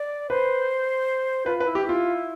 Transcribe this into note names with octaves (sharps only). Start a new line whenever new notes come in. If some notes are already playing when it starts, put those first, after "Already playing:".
Already playing: D5
B4 C5
F4 B4
B4
E4
G4
E4 F4